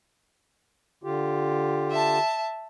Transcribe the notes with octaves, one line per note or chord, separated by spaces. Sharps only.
D3 F4 G4
E5 A5